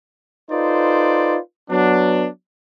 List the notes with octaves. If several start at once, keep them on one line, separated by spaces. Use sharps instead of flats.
D#4 F4 A4 B4 C5 D5
F#3 B3 D4